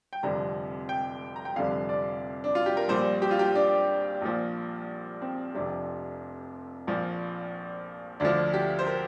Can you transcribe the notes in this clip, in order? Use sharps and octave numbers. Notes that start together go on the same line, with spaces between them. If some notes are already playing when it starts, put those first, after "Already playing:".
G5
F1 F2 D3 G3 A#5
G5
A#5
G5
F1 F2 D3 G3 F5
D5
D4
F4
G4
A#4
A#1 A#2 G3 C5
G4
F4
G4
D4
A#1 A#2 F3
C4
F1 F2 C3 D4
A#1 A#2 F3
D2 D3 F3 D4
G4
C5
A#4